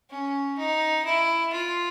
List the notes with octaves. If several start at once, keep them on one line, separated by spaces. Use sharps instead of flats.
C#4
D#4
E4
F4